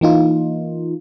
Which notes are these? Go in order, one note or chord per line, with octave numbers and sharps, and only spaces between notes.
E3 A#3 D#4 F4